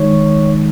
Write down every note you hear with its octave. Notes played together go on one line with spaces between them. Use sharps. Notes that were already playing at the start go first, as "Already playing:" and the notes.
Already playing: D#3 G#3 D#4 C#5